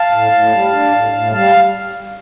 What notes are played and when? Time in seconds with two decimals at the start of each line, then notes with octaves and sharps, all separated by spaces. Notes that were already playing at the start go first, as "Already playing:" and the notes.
Already playing: F5 A5
0.12 A2
0.32 A2
0.52 G3
0.72 D4
0.92 A2
1.12 A2
1.32 G3 F5 A5